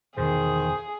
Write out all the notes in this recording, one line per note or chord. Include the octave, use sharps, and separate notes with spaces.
E2 B2 D3 D#3 G#4 C5